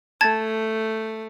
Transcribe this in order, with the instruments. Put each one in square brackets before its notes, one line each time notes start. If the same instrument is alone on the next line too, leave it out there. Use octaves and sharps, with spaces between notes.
[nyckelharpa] A3 [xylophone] A5 G#6 A6